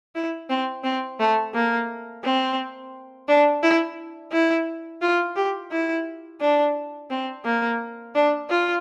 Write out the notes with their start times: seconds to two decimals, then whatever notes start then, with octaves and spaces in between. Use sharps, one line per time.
0.15 E4
0.50 C4
0.84 C4
1.20 A3
1.54 A#3
2.24 C4
3.28 D4
3.63 E4
4.32 E4
5.01 F4
5.36 G4
5.71 E4
6.41 D4
7.10 C4
7.45 A#3
8.15 D4
8.50 F4